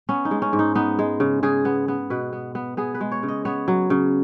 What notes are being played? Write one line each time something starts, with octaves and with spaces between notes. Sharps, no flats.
B3 C#4
D#4
G#3
C#4
G#2
D#4
B3 D#4
G#3
C#3
C#3 G#4
B3
B3
B2 B4
B3
B3
B3 G#4
B4
G#3
C#5
C#3
D#5
B3 C#5
F#3
C#3